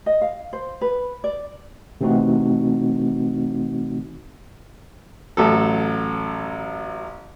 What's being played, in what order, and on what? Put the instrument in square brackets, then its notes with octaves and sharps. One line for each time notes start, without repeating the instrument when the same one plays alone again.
[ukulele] D#5
F5
C5
B4
D5
[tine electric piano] C3 E3 A3 C4 D#4 F#4
[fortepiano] A1 F#3 A4